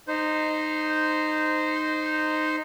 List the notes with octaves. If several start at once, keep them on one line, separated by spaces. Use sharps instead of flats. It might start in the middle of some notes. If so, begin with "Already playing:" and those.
D#4 C5